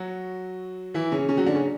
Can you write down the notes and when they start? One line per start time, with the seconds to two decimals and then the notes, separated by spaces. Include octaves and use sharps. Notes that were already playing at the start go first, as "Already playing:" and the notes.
Already playing: F#3 F#4
0.94 E3 E4
1.12 C#3 C#4
1.29 C#3 C#4
1.37 F#3 F#4
1.46 D3 D4
1.55 C#3 C#4